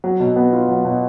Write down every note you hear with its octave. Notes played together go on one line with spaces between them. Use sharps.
F#3
B2
B3
F4
F#3
B2